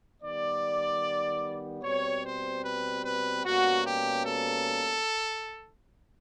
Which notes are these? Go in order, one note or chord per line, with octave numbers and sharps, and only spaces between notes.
D#3 G3 B3 D5
B2 G3 C4 C#5
C5
B4
B4
B2 G3 A#3 C#4 F#4
G4
A4